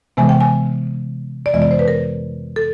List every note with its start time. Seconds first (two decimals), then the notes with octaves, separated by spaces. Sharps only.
0.17 C3 E3 G#3 B3 G#5
0.29 G5
0.41 G#5
1.46 D5
1.53 F2 C3 E3 G#3 B3 D#5
1.62 D5
1.71 C5
1.79 B4
1.88 A#4
2.56 A4